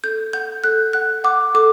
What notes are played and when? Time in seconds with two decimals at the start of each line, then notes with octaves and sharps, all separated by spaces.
0.04 A4 G6
0.33 F#5 G6
0.64 A4 F#6
0.93 F#5 F#6
1.24 F#5 D6
1.55 A4 D6